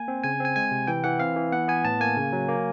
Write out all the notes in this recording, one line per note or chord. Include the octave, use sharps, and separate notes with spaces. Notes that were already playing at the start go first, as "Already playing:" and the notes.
Already playing: A#3 G#5
C4
C#3 G#5
C4 G#5
G#3 G#5
C3
E3 G5
E3 F#5
C4 F5
E3
B3 F#5
B3 G#5
A2 A5
A#3 G#5
C#3
F#3
A#3